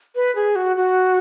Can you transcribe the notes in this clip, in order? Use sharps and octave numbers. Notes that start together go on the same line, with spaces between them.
B4
G#4
F#4
F#4